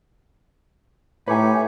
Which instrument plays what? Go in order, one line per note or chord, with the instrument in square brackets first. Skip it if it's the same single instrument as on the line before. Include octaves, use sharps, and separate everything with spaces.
[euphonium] A2 [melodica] D#4 G4 C#5 [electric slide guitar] B4 G#5